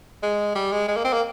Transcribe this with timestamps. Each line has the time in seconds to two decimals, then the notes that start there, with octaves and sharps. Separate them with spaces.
0.23 G#3
0.55 G3
0.72 G#3
0.88 G#3
0.96 A#3
1.04 C4
1.13 A#3